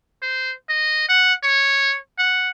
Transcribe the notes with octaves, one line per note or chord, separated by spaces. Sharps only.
C5
D#5
F#5
C#5
F#5